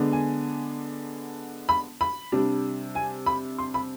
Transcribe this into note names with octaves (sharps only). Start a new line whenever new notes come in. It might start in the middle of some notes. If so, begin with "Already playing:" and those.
Already playing: D3 G#3 B3 D4
G#5
B5
B5
C3 G3 D4
G#5
B5
C6
B5